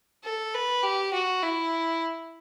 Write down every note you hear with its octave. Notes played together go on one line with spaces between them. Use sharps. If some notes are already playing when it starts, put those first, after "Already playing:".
A4
B4
G4
F#4
E4